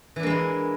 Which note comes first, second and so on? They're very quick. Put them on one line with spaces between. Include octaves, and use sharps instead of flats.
E3 D4 A#3 G#3 E4